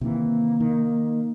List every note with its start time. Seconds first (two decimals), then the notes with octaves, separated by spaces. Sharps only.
0.01 C3 D#3 E3 A#3
0.60 D#3